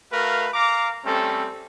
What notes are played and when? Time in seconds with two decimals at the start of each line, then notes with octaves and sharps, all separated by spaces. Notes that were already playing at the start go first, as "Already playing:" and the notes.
0.12 A3 F#4 A#4 B4 F5
0.53 F5 A#5 D6
1.05 G3 A3 C4 C#4 A4